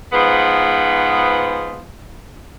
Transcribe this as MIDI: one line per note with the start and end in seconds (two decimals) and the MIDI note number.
0.12 1.85 44
0.12 1.85 53
0.12 1.85 59